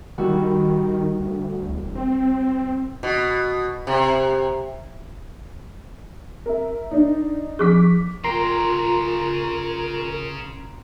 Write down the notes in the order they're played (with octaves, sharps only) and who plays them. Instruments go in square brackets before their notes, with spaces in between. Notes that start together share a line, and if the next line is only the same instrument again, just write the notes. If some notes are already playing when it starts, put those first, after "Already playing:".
[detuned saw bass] D#3 [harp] G3 E4 F#4
[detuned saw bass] D2
E1
C4
[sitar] B2
C3
[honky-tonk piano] A#4 E5
D4 D#4
[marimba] F3 G#4 [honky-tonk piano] C#6 D6 B6
[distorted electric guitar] C#3 G5 [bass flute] F4 [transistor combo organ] A#4 [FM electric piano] A#5 C6